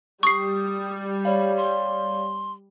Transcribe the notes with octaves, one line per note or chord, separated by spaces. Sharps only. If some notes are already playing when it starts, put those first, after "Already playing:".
G3 C#6 D#6 C7
C#5 D5 F5 B5
C6